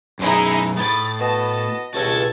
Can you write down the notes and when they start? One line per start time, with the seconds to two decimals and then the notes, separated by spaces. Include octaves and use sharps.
0.19 F#2 B2 D#4 E4 G#4
0.77 A2 B5 D#6 A6
1.20 B3 F#4 D#5 A5
1.94 C#2 G2 B2 F#4 A4 A5 G#6 A6